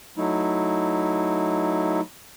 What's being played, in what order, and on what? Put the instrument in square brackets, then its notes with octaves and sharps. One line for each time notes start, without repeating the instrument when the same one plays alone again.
[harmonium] F#3 A3 D#4 E4